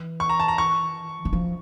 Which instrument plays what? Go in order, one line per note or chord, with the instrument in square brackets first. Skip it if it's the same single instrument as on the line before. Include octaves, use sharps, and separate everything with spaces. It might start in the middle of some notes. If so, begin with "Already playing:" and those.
Already playing: [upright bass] E3
[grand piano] C#6
A#5
A5
A#5
C#6
[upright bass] E3
F3